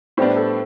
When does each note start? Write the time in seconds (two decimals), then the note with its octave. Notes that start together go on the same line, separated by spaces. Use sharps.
0.17 A2 G3 B3 D4 C5
0.36 A4